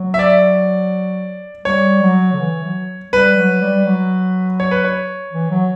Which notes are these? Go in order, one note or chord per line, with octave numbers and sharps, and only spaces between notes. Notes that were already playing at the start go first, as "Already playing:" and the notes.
Already playing: F#3
E5
D5
G3 C#5
F#3
D3
E3
F#3
G3 B4
F#3
G3
F#3
C#5
B4
C#5
E3
F#3